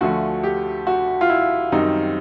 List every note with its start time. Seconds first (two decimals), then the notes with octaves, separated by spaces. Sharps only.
0.01 D2 D3 F3 A3 F#4
0.43 G4
0.87 F#4
1.21 F4
1.29 E4
1.72 F#2 D#3 G3 C4 D#4